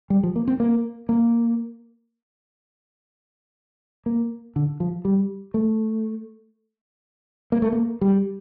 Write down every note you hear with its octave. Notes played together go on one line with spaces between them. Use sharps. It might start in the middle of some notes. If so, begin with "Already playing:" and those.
G3
F3
A#3
C4
A#3
A#3
A#3
D3
F3
G3
A3
A#3
A3
A#3
G3